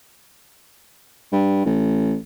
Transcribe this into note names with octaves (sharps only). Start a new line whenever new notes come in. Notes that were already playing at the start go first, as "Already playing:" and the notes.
G2
A1